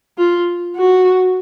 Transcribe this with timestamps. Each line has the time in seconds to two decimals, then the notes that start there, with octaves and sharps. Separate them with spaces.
0.18 F4
0.75 F#4